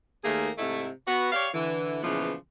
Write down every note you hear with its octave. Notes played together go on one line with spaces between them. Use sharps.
D#2 D#3 A3 A#3 G#4
G#2 C3 G#3 A3 E4
B3 F#4 F#5
G4 C#5 D5 F5
D3 E3
A#2 C#3 E3 F3 G#3 B3